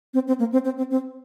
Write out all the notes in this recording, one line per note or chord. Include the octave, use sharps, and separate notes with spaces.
C4
C4
A#3
C4
C4
C4
C4